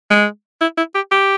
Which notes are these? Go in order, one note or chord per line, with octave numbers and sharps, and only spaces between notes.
G#3
E4
E4
G4
G4